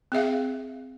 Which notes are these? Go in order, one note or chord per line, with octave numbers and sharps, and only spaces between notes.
C4 G#4 E5 F5